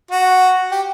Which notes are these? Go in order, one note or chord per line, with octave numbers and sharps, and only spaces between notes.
F#4
G4